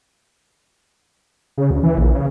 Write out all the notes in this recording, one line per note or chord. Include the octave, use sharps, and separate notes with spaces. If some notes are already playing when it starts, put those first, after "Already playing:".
C#3
D2
E3
A#1
C#3